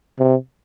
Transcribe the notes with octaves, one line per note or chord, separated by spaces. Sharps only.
C3